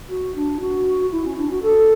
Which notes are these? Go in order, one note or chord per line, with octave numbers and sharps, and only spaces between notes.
F#4
D4
F#4
E4
C#4
D4
F#4
A4